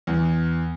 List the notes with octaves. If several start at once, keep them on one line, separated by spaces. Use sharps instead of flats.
E2